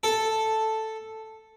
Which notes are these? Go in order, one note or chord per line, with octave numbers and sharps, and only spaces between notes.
A4